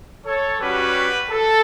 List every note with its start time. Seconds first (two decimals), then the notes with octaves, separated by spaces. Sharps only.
0.26 A4 C#5
0.60 G3 C#4 F#4 G4 B4
1.30 A4